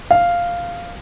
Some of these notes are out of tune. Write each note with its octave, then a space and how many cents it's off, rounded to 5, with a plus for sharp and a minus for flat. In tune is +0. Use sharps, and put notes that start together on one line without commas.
F5 -5